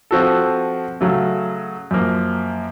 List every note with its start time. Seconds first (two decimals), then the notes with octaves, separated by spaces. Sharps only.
0.11 F3 C4 F#4 A4
1.01 C#3 F#3 A3
1.91 F#2 F3 A#3